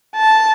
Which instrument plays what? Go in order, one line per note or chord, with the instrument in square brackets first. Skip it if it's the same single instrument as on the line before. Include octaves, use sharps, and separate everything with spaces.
[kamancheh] A5